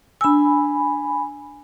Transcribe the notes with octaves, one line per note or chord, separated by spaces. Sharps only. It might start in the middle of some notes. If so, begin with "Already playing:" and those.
D4 G#5 B5 E6